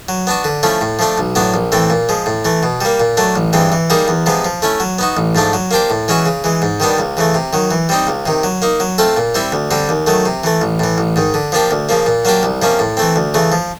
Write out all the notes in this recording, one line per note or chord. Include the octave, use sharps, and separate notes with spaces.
F#3
B3 D4 F#4
D3
F3 A3 C#4 E4
A2
F3 A3 D4
B1
A2 F#3 B3 D4
A#1
A2 E3 A3 C4
A#2
F3 G#3
A2
E3 A3
B2
G3 A#3
A#2
F#3 A3 D4
A1
G2 E3 G#3 C4
E3
G3 A#3 D#4 G#4
E2
C3 F3 G#3 B3
F3
A3 C#4 E4
F#3
B3 D#4 F#4
A1
G#2 F3 A3 D4
F#3
A#3 D4 G4 C5
A2
E3 G#3 C#4 F#4
C#3
E3 G#3
G#2
D#3 G3 B3 D4
C#2
C#3 E3 A3
C3
D#3 F#3
E3
G3 C4 D#4
C#2
C3 D#3
F#3
A#3 D#4
F#3
A3 C4 F4 A4
A#2
G3 C4 E4
D2
D3 G3 C4
D#2
D#3 F#3 A3
C3
E3 A3
A1
A2 E3
A1
G#2 D#3
D3
F3 A#3 D4 G4
D2
C#3 F3 A#3
A#2
F#3 A#3 D4 G4
C2
C3 F3 A#3 C#4
A2
E3 A3 C4
D2
C#3 E3 A3
F3